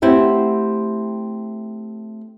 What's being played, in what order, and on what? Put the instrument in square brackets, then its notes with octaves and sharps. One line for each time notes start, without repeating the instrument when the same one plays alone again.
[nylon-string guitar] A3 C4 E4 G4 F#5